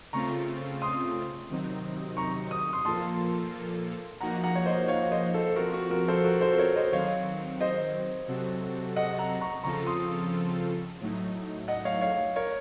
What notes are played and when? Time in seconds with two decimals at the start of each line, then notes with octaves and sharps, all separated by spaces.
0.13 C#3 A3 C4 F4 A#5 C#6
0.82 C6 D#6
1.50 C3 D#3 F#3 C4 D#4
2.17 A#5 C#6
2.51 D#6
2.73 C6 D#6
2.85 A#2 F3 A#3 F4 A4 A5 C6
4.21 F3 A#3 D#4 F#4 F#5 A#5
4.44 F#5 A#5
4.56 C#5
4.66 C5 D#5
4.88 C#5 F5
5.11 C5 D#5
5.34 A4 C5
5.56 F3 C4 F4 F#4 A#4
5.73 F#4
5.91 F#4 A#4
6.08 A4 C5
6.24 F#4 A#4
6.41 A4 C5
6.58 A#4 C#5
6.76 C5 D#5
6.92 D#3 F#3 C4 C#5 F5
7.61 C5 D#5
8.28 C3 F#3 C4 F#4 A4
8.96 D#5 F#5
9.19 F#5 A#5
9.41 A#5 C#6
9.64 C#3 F3 C4 F4 A4 A#5 C#6
9.86 C6 D#6
11.01 A2 F#3 A3 D#4
11.68 D#5 F#5
11.85 C#5 F5
12.01 C#5 F5
12.36 A#4 C#5